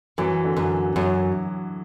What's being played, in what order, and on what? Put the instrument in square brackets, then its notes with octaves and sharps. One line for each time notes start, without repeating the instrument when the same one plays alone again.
[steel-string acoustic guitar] F#2 [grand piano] E3
[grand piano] D3
[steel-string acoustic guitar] F#2
[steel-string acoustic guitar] F#2 [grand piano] F#3